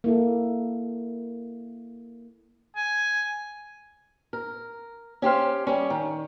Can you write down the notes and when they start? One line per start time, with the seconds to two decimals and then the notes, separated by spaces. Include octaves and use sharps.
0.04 A#3 E4 A4
2.76 G#5
4.33 A#4
5.22 C#4 G4 C5 F5
5.67 G3 C#4
5.90 D#3